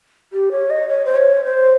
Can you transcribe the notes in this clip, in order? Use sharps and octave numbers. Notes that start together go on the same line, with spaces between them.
G4
C#5
D#5
C#5
C5
C#5
C5